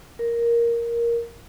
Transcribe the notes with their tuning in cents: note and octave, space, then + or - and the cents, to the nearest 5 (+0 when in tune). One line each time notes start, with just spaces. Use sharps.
A#4 +5